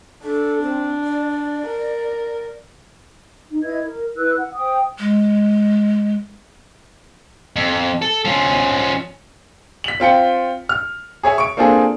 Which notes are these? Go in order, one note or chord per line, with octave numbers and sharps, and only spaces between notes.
D4 A4
C4
D5
A#4
D#4
E4 B4 D#5 G#6
A#4
E4 B4 E6 F#6
F#5
C5 G5 D#6
G#3
F2
A4
F3 C#4
B6 F#7
C4 F4 G5 C#7
F6
G#4 C#5 E5 G#5
C#6 D7
A#3 C4 D4 F4 G#4 A4